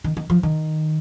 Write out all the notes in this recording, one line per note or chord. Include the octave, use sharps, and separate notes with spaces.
D#3
D#3
F3
D#3